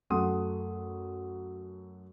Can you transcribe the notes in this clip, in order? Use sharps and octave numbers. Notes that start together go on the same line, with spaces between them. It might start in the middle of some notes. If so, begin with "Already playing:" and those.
F#2 A3 F#5 C6 D#6